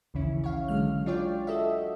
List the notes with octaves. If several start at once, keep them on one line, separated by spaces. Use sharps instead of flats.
A#1 D#2 C#3 E3 C#4 E4
C#5 F5
D3 F#3 G#3 F6
D4 F4 C#5 D5 G5
F#4 A4 D#5 E5